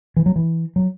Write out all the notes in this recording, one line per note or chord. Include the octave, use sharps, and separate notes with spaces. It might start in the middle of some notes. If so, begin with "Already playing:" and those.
E3
F#3
E3
F#3